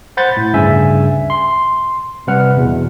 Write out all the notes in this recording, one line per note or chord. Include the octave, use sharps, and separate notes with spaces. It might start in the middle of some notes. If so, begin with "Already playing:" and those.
C5 F#5 B5 G6 A6
A2
D2 G2 C#3 E5 G#5
C6
C3 G3 B4 F#5 F6
E2 B2